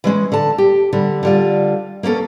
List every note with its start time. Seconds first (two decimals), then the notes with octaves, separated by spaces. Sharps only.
0.04 E3 G#3 C4 C#4
0.32 D3 A5
0.58 G4
0.93 D3 G3
1.23 D3 G3 F4
2.03 A#3 B3 C#4 A4